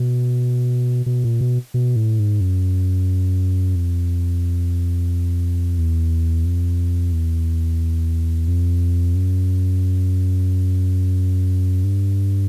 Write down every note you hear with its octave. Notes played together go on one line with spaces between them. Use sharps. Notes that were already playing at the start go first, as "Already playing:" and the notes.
Already playing: B2
B2
A#2
B2
B2
A2
G#2
F#2
F2
E2
F2
E2
F2
F#2
G2